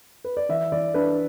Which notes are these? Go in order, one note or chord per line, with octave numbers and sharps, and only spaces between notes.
B4
D5
E3 E5
E3 D5
D4 B4